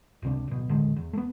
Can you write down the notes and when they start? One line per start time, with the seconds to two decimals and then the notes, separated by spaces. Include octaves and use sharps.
0.22 C#2 C3 D4
0.48 D1 B2
0.69 D#1 A1 D3 G#3
0.96 E2
1.13 A3 B3